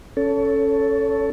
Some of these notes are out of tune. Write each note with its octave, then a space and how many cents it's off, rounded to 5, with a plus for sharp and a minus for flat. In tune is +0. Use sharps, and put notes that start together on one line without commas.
C#4 +0 A4 +0 C#5 +30